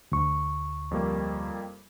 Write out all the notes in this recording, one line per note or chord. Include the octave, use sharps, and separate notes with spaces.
D2 C#6
F2 G3 A#3